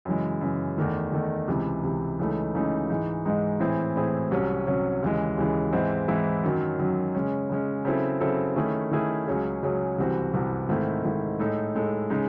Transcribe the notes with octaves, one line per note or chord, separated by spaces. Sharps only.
F#2 C#3 E3 G#3
F#2 C#3 E3 G#3
E2 D#3 A3
E2 D#3 A3
C#2 C3 E3
C#2 C3 E3
C#2 C#3 E3 A3 D#4
C#2 C#3 E3 A3 D#4
G#2 E3 G#3 D#4
G#2 E3 G#3 D#4
A2 E3 C4 E4 G#4
A2 E3 C4 E4 G#4
C2 C3 F#3 C#4
C2 C3 F#3 C#4
D#2 C#3 E3 G#3
D#2 C#3 E3 G#3
G#2 E3 G#3 C4 E4
G#2 E3 G#3 C4 E4
F#2 D#3 F#3
F#2 D#3 F#3
C#3 G#3 C#4
C#3 G#3 C#4
C#3 F#3 C4 E4 A4
C#3 F#3 C4 E4 A4
D#3 A3 C#4 E4 G#4
D#3 A3 C#4 E4 G#4
C#2 C#3 F#3 C#4 G#4
C#2 C#3 F#3 C#4 G#4
C2 C3 E3 C4 F#4
C2 C3 E3 C4 F#4
G#2 D#3 A3 C4 E4
G#2 D#3 A3 C4 E4
A2 G#3 D#4 A4
A2 G#3 D#4 A4
C#3 G#3 D#4